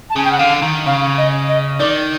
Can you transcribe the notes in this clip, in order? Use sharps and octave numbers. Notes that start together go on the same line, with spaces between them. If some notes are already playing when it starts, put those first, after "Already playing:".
A5
C#3 G#5
G5
F#5
D3 F5
D#3
C#3 F5
D#5
D#5
D#3 D5